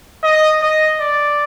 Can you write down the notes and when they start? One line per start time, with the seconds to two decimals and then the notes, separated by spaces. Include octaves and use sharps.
0.24 D#5
0.62 D#5
1.01 D5